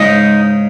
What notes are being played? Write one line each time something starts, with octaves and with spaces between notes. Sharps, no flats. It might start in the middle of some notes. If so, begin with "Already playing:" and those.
Already playing: G#2 C#3 D#4